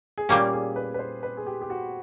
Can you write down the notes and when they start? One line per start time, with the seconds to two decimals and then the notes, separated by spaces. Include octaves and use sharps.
0.18 G#4
0.29 A#2 G3 A#3 C#4 G4
0.53 G#4
0.76 B4
0.94 B4
0.99 C5
1.23 B4
1.37 G#4
1.47 G4
1.62 G4
1.70 F#4